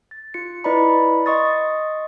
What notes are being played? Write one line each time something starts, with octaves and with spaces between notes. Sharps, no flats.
A6
F4 C#7
E4 B4 D5 D#5 A#5 B5
D#5 C6 C#6 D#6 A6